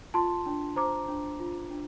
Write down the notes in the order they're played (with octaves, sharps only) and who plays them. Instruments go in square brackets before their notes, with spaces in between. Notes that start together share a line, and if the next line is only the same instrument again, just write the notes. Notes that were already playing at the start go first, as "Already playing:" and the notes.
[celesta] F4 A5 C6
D4
C5 A#5 D6
D4
F4
D4